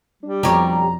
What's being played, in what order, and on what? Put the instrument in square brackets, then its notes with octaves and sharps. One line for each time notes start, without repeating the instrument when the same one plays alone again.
[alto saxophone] G3 [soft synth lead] D4
[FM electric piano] F2 B2 D4 [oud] G4 C#5 [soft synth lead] A#5